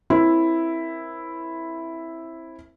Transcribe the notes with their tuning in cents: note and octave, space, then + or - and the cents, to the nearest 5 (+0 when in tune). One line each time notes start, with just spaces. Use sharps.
C4 +25 E4 +0 A#4 +20